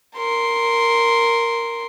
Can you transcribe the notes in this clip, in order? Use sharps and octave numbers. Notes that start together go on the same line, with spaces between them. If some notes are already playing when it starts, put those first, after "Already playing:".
A#4 C6